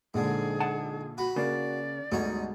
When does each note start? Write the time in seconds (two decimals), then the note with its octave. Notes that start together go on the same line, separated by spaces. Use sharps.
0.14 A#1 G#2 D3 G#4
0.60 F#5 A5
1.18 F#4 B5
1.36 C#3 A#3 D5
2.12 D2 G#2 B2 G3 D#4 C#5